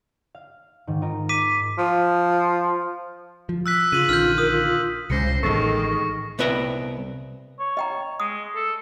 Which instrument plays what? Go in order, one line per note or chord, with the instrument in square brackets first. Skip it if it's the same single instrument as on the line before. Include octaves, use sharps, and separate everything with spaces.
[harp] F5
G#2 D#3
D#4 F4 A#4
[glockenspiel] D6 B6 D#7 [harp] A#6
[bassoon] F3
[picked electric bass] F3
[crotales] E6 F#6 B6
[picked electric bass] C#3 [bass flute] F4 [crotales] D#7 F#7
[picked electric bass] A#1 D3 D#3 [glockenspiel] F6 G6
[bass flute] A#4 [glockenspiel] D#6
[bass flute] F4
[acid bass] C#2 [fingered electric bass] C3 G#3 C#4 [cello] C5 [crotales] A#6 C#7
[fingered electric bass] A1 [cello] D#3 G#3 [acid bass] A4 [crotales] C#6
[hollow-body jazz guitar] C2 B3 B4 E5 G5 A#5
[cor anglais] C#5
[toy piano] D#5 G5 A#5
[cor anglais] G#3 [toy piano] D#6
[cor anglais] A4